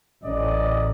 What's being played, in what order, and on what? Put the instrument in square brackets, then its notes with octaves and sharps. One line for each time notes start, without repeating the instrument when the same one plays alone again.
[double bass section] A1 [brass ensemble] C#4 D5 D#5